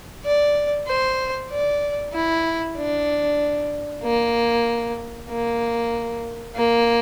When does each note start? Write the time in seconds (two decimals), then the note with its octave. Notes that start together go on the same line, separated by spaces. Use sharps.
0.25 D5
0.88 C5
1.50 D5
2.13 E4
2.77 D4
4.02 A#3
5.30 A#3
6.55 A#3